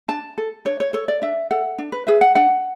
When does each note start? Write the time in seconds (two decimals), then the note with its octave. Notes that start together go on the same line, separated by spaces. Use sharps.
0.08 D4 A5
0.38 A4
0.65 D4 C#5
0.80 C#5
0.93 A4 C#5
1.08 D5
1.22 D4 E5
1.51 A4 F#5
1.78 D4
1.92 B4
2.07 G#4 B4 E5
2.21 F#5
2.35 D4 F#5